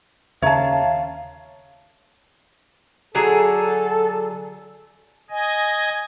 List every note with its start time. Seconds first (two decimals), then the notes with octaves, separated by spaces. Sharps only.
0.42 D#2 C#3 C#5 E5 F5 A5 A#5
3.15 D3 F#3 G#4 A4
5.30 D#5 G#5